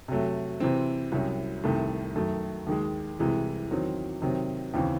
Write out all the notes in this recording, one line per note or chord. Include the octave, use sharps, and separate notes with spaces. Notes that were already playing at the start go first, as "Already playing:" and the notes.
C3 F#3 A3
C3 E3 C4
C2 C3 F#3 C#4
C2 C3 D#3 A3
F#2 D#3 A3
D#2 D#3 G#3
C2 C3 E3 G#3
E2 D#3 F#3 C4
C3 D#3 F#3 C4
D#2 C#3 E3 C4